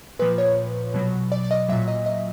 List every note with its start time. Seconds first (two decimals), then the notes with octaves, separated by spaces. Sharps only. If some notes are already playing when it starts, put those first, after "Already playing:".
0.19 A#2 F3 B4
0.38 C#5
0.94 B2 F#3
1.32 D5
1.44 D5
1.51 D#5
1.69 A#2 F#3 E5
1.88 D#5
2.06 D#5